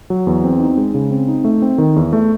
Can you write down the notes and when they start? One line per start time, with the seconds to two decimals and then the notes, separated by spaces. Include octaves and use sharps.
0.10 F#3
0.27 E2
0.44 C4
0.60 D#4
0.77 G#3
0.95 C#3
1.11 C4
1.28 D#4
1.44 A3
1.62 C4
1.78 D#3
1.96 E2
2.13 A3